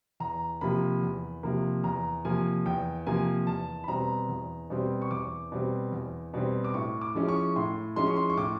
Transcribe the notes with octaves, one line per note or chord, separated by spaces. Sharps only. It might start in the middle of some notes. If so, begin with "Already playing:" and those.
E2 A#5
C3 F3 A#3 B5
E2
C3 F3 A#3
E2 A#5
C3 F3 A#3 G#5
E2 G5
C3 F3 A#3 G#5
E2 A5
B5
B2 G3 C4 A#5
E2
B2 G3 C4
C#6
E2 D6
B2 G3 C4
E2
B2 G3 C4
D6
A2 C#6
D6
F3 G#3 C#4 E4
C#6
A2 C6
F3 G#3 C#4 E4 C6
C#6
C6
C#6
A2 D6